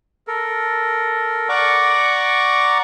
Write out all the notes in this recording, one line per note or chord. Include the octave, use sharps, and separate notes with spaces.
A4 A#4
D5 F#5 A#5 C#6 D6